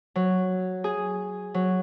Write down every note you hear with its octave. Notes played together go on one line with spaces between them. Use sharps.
F#3
G#4
F#3